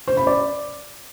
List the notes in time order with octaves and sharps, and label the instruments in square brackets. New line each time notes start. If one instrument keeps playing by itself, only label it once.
[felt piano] C5
B5
D5